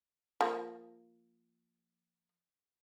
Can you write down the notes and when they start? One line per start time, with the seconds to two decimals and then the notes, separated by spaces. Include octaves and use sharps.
0.41 F3 A#3